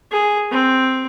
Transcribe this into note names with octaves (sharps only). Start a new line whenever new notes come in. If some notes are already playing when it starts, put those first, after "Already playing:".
G#4
C4